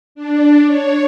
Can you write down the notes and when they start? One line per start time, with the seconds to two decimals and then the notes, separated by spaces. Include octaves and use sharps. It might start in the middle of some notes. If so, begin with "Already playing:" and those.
0.15 D4
0.66 C#5